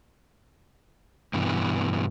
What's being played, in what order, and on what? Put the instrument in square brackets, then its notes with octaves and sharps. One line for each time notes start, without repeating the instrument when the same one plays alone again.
[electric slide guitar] G2 B2 E3